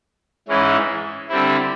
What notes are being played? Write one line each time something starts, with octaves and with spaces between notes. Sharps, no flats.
G#2 E3 G#3 C#4 E4
D3 G3 C4 E4